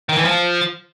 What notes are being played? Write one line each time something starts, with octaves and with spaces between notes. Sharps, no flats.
D#3
E3
F3